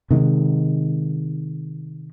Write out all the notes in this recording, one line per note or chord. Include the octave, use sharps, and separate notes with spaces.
C3 D#3 G#3